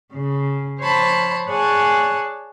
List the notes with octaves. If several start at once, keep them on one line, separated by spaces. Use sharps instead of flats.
C#3
F3 C5 C#5 A5 B5
G#4 C#5 D5 F#5 G#5 A5